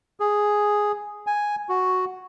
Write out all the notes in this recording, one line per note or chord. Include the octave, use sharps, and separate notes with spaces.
G#4
G#5
F#4